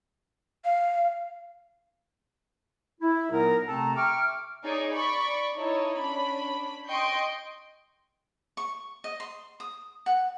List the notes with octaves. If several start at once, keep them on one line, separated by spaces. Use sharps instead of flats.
F5
E4
A#2 F#3 B3 D#4 A#4
C3 A3 C4 A4 A5 A#5
E5 G5 C#6 D6 F6
D#4 G#4 C#5 D5
D5 B5 C#6
D#4 E4 A4 C#5
C#4 D4 B5
D#5 G5 C6 C#6 G6 D7
C#6
D#5
C6
D#6
F#5